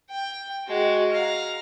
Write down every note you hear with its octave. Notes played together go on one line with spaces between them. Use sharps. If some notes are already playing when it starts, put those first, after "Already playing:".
G5
G#3 F#4
F5 A#5